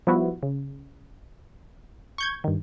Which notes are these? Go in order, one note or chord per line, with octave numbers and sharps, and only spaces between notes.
F3 G3 B3 E4 F#4
C#3
C#6 G6 G#6
G2 D#3